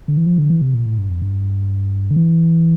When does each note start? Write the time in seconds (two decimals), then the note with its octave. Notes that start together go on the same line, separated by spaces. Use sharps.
0.08 D3
0.17 E3
0.26 F3
0.38 D3
0.50 E3
0.61 C3
0.74 A#2
0.86 A2
0.98 G2
1.09 F2
1.22 G2
2.10 D3
2.16 E3